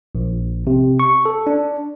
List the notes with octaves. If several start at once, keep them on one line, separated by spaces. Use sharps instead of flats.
A#1
C3
C#6
A4
D4